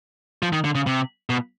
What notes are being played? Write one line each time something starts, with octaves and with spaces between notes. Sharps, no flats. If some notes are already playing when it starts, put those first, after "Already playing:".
F3
D#3
D3
C#3
C3
B2